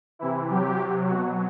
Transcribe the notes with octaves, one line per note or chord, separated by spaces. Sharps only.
C3 E3 E4
C3 F#3 G4
C3 F#3
B2 F#3 F#4